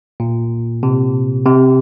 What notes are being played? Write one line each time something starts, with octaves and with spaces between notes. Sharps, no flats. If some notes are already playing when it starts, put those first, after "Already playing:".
A#2
C3
C3